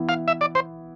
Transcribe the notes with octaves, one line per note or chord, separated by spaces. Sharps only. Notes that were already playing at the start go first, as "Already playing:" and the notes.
Already playing: E3 B3 E4
F5
E5
D5
C5